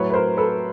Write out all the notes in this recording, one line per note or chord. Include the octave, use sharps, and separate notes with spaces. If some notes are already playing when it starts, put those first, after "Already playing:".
Already playing: A2 F#3 B4 C#5
B4
A#4 C5
A4 B4